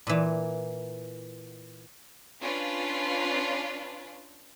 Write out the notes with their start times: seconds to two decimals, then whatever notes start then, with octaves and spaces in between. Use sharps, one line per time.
0.07 A#2 E3
2.41 C#4 D4 F4 B4